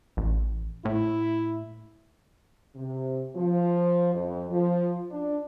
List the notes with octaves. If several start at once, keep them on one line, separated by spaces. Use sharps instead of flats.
A1
A2 E4
C3
F3
F2
F3
D4